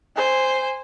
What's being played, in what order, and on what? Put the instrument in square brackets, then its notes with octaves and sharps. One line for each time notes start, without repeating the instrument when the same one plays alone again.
[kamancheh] C5 G#5